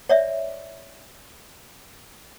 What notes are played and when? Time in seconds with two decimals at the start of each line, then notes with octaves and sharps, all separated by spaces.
0.09 C#5 D5 E5